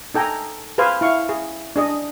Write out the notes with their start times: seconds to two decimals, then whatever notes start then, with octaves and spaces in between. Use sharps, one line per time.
0.14 D#4 A4 G5 G#5 A#5
0.78 G#4 B4 C5 F5 G#5
1.01 E4 F5 C#6
1.29 G#4
1.76 D4 G#4 D#5